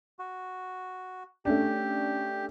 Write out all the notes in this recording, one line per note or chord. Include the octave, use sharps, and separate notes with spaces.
F#4
A3 C#4 D4 G4